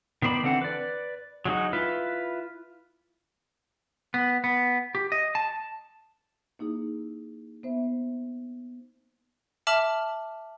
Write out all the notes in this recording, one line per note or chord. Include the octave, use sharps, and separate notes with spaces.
D#3 B3 C5 D5 B5
D3 E3 C4 A4 F#5
B4 D5
F#3 G#3 D#4 F#4
E4 F4 B4
B3
B3
G4
D#5
A5
A#3 D#4 E4 G#4
B3 C5 E5
E5 A5 D6 F6 F#7